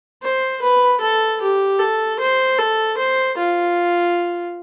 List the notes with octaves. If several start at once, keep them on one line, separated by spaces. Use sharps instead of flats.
C5
B4
A4
G4
A4
C5
A4
C5
F4